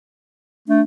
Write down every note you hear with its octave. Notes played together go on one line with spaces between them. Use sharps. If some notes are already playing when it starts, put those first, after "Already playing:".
A3 D4